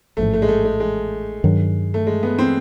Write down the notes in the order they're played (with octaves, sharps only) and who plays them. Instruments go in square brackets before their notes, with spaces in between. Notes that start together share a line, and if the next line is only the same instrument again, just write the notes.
[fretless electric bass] A1 G#2 F3 [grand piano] A3
[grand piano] A3
G#3
A3
G#3
G#3
[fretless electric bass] G2 D#3 F#3
[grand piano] A3
G#3
B3
C4